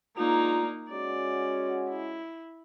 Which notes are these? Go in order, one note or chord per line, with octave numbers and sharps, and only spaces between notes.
G#3 A#3 D4 D#4 F4
G#3 C#4 F#4 D5
E4